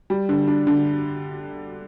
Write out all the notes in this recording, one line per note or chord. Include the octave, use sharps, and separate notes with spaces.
G3
D3
D4
D3